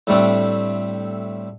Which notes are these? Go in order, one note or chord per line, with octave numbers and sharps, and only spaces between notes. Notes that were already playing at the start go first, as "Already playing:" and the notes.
A2 G3 A3 C4 D4